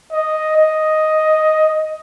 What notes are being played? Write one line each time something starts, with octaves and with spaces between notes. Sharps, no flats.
D#5
D#5